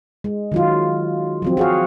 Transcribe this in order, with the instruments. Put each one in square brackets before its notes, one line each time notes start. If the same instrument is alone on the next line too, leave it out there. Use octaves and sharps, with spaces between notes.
[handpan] G#3
D#3 F#3 F4
F3 F#3 C4
F#4 G#4 F5